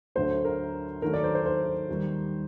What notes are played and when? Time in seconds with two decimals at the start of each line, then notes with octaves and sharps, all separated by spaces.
0.15 D2 D3 F#3 A3 C5
0.45 A#4
1.02 D#2 D#3 F#3 A3 A#4
1.13 D5
1.24 C5
1.35 C5
1.46 C5
1.89 D#2 D#3 G3